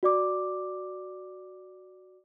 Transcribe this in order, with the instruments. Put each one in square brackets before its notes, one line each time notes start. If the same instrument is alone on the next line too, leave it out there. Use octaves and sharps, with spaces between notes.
[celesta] F#4 D5 D6